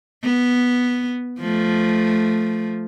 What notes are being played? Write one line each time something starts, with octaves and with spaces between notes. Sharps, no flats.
B3
F3 A3